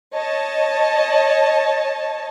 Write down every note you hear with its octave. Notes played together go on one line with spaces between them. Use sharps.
C#5 D#5 A5